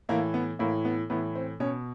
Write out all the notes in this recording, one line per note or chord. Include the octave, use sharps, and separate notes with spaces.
A2 E3 A#3
B3
A2 E3 A#3
B3
A2 E3 B3
C4
B2 C#4